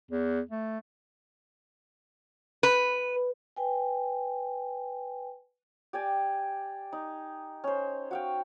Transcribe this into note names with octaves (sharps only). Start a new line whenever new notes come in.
E2
A3
B4
B4 G5 G#5
G4 D5 G#5
D#4
C#4 C5
F#4 F5 G5